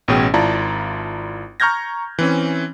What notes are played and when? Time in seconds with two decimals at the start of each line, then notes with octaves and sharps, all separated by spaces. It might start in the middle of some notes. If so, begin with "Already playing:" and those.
0.08 A1 B2 C#4 G#4 G5
0.34 G#1 E4 F4 D5 A5 A#5
1.60 A#5 C#6 F6 G6 G#6 A#6
2.19 E3 C4 C#4